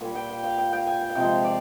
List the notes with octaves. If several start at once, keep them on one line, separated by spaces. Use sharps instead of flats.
A#2 G3 G#5
G5
G5
F5
G5
G5
G#5
G5
F5
C3 F3 G#3 G5
F5
D5